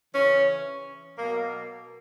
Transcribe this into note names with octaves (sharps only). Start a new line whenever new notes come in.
C#3 E3 C#4
B2 F#3 A#3